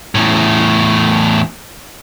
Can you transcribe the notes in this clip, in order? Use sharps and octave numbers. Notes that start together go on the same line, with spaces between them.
E2 A2